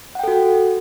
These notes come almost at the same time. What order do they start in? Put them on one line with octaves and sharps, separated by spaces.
F#5 G5 A4 F#4